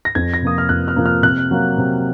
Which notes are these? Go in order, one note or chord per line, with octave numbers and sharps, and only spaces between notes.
A#6
F2 G#6
A#6
C3 F3 A#3 D#6
F6
F2 F#6
F6
C3 F3 A#3
F6
C3 F#6
F#3 A#3
C3